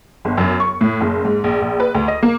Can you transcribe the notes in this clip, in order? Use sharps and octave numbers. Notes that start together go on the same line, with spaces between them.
G1
F#2
C#6
A2
F#1
G#2
A#1
A#1
B4
D2
D#5
A#3